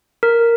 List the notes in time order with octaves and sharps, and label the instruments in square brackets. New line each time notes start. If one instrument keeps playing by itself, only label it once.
[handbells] A#4